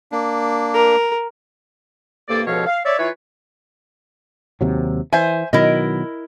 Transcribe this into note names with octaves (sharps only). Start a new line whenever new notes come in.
A#3 D4
A#4
C2 G2 A#3 A4 D5
C#2 B2 F3 A4 C#5 F5
F5
C#5 D5 E5
E3 E4 F4 B4 C#5
D#2 C3 F#3
E3 C5 E5 G#5
B2 D#3 F#3 E4 A#4 D#5